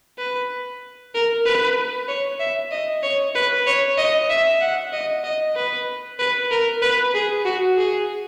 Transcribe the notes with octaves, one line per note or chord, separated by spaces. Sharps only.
B4
A#4
B4
C#5
E5
D#5
C#5
B4
C#5
D#5
E5
F#5
D#5
D#5
B4
B4
A#4
B4
G#4
F#4
G#4